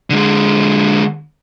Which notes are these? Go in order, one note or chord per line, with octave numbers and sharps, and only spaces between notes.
D3 G#3